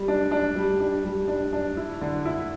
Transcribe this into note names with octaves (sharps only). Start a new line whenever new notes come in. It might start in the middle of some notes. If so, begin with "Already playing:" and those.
Already playing: G3
D4
D4
G3
D4
G3
D4
D4
E4
D3
E4